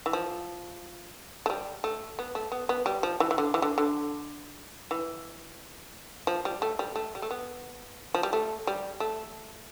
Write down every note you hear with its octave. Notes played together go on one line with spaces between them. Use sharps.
E3
F3
A3
G3
A3
B3
A3
B3
B3
G3
F3
E3
E3
D3
E3
D3
D3
E3
F3
G3
A3
G3
A3
G3
A3
B3
F3
G3
A3
G3
A3